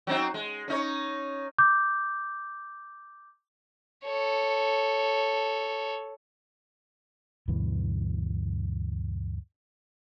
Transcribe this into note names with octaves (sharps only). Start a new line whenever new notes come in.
F#3 C4 D#4
G#3
C#4 D#4 C#5
D6 G6
A4 C#5
D2 G2 B2 E3